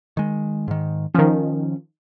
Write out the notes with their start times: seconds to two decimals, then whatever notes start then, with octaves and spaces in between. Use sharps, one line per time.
0.17 D#3 G#3
0.68 G#2 D#3
1.15 D#3 F3 C#4